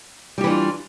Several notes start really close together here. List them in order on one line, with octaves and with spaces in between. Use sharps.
G3 G4 E3 D4 F4